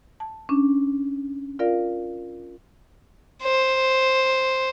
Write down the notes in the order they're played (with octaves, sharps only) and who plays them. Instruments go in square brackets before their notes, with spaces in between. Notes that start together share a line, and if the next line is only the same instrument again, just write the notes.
[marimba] A5
C#4 D4
F4 A#4 D5 F5
[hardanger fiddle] C5